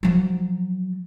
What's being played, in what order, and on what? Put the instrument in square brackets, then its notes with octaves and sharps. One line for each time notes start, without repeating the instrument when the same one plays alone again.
[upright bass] F3 F#3